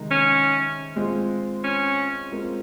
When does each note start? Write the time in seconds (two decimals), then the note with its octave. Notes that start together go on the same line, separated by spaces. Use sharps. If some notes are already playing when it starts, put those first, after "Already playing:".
Already playing: C3 D#3 G#3 D#4 A#4
0.11 C#4
0.96 G#3 C4 F4
1.64 C#4
2.31 G#3 C4 F4 A#4